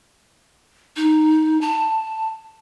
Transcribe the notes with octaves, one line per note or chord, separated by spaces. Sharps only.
D#4
A5